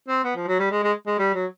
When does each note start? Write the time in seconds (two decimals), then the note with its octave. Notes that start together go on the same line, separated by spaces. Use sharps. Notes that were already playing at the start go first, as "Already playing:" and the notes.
0.08 C4
0.24 B3
0.36 F3
0.47 F#3
0.59 G3
0.71 G#3
0.83 G#3
1.07 G#3
1.19 G3
1.35 F#3